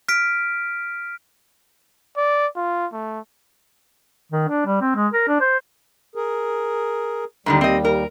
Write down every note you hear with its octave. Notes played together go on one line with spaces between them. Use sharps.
F6 B6 D7
D5
F4
A3
D#3
D4
G3
C4
G#3
A#4
D4
C5
G#4 A#4
D#2 G#2 D3 D#3 G3
C4 D#5
A#4